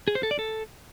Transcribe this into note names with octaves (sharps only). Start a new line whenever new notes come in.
G#4
C5
A4
D5
A4